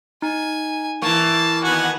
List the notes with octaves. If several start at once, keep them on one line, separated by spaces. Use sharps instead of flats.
D#4 G#5
E3 A#3 A5 C#6
D#3 B3 F#4 F#5 G#5